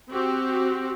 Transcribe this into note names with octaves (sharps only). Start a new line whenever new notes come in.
C4 F#4 G4